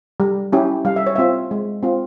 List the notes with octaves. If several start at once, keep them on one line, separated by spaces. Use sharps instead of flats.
G3
C#4 E4 G4
G3 F5
E5
C#5
C4 F4 E5
G#3
C4 F4